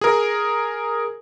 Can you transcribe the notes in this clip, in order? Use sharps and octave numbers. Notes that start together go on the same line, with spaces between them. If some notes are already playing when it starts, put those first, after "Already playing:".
G#4 A#4